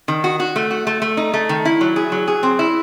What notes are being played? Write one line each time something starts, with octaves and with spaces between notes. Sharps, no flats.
D#3
F#4
F#4
A3
F#4
A3
A3
D#4
A3
D#3
E4
F#3
G#4
F#3
G#4
C4
E4